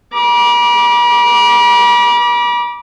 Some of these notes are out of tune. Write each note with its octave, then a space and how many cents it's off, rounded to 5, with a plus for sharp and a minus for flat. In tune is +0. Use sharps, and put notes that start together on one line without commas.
B5 -45 D6 -5